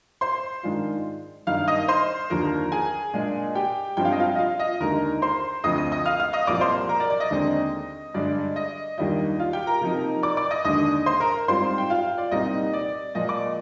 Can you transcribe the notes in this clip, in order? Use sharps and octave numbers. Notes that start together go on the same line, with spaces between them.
C5 C6
G#2 D#3 G#3 D4 F4
G2 D#3 A#3 D#4 F5 F6
D#5 D#6
C5 C6
D#2 D3 F3 A#4 A#5
G#4 G#5
A#2 G#3 D4
G4 G5
G2 F3 G#3 C4 G5
F5
D#5
F4 F5
D#5
F4 F5
D#5
D#2 D3 G#3 D#4 A#4 A#5
C5 C6
D2 D3 F3 C4 D#5 D#6
D#5 D#6
D#5 D#6
F5 F6
F5 F6
D#5 D#6
C2 A#2 F3 D5 D6
C5 C6
A#4 A#5
D5
D5
D#5
D#2 D3 G#3 C4 D#4
G2 D3 G#3 D4 D5
D#5
D#2 D#3 G3 D4 F4 D#5
F4 F5
G4 G5
A#4 A#5
C3 F3 A#3 D#4
D5 D6
D5 D6
D#5 D#6
D#2 D3 G#3 D4 D#5 D#6
C5 C6
A#4 A#5
G#2 G3 C4 F4 C5 C6
G5
F4 F5
D5
C2 A#2 G3 C4 D#4 D#5
D5
A#2 F3 G#3 D#5
D5 D6